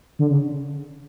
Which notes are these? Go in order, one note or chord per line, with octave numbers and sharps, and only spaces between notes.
D3
C#3